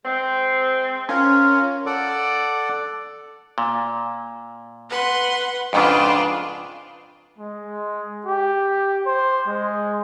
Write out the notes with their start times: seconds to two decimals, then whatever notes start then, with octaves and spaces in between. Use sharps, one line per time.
0.04 G#3 C4
1.09 C#4 F4 A#4
1.86 A4 D5 F#5 D6
3.58 A#2
4.89 B4 F#5 C6
5.73 F2 G#2 C#3 D4 F4 B4
7.38 G#3
8.26 G4
9.06 C5
9.47 G#3